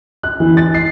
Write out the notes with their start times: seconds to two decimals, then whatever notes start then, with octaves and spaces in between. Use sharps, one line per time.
0.23 F#6
0.40 E3
0.57 A6
0.74 C7